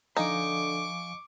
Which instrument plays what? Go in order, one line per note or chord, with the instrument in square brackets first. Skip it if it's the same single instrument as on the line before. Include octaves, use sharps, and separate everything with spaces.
[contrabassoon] D3 [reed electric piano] F3 F5 G#5 [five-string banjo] D#4 [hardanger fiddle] C#6 D6